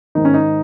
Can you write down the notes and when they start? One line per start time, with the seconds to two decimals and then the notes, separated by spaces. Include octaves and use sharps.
0.15 G#2 D#3 D#4
0.25 C#4
0.34 D#4